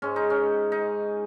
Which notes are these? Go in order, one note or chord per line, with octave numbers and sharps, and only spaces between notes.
G#2 G#3 C#4
D#4
C#4
D#4